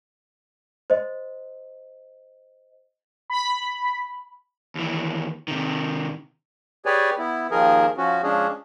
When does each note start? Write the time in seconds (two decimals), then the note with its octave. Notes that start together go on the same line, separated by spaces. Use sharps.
0.90 C5 D#5
3.30 B5
4.75 D#2 E3
5.48 C3 D#3
6.86 G4 G#4 B4 C#5 D5 G#5
7.18 B3 E4
7.51 D#2 D#3 F3 G#4 A#4
7.97 F3 C#4 F#4
8.23 F3 G#3 C#4 D4 G#4